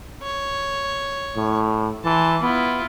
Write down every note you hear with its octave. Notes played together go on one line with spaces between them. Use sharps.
C#5
A2
E3 A5 C6
B3 E4 F4